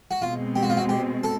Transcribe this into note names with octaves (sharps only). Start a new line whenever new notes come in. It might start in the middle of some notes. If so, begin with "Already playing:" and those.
F#4
B2 G#3 C4 F4
G4
F#4
F4
F#4
G4
A4